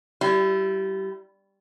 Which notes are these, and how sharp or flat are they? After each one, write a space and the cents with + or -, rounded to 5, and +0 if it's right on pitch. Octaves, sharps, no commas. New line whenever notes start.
G3 -25 E4 +20